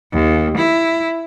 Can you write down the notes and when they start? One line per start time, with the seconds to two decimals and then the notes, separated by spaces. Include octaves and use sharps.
0.13 D#2
0.57 E4